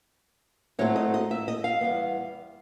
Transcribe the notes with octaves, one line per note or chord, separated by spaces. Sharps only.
A2 F#3 A3 C4 C#5
D#5
D#5
E5
D#5
F5
E2 B2 G3 B3